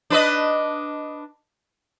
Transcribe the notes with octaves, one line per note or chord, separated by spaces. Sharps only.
D4 B4 D#5